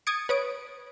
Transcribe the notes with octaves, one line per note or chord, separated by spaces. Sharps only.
D#6 G#6 A6 C#7 D7
B4 C#5 D#6 D7